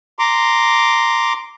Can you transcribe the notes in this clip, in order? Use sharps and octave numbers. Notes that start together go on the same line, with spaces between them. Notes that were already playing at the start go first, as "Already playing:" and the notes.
A#5 C6 D6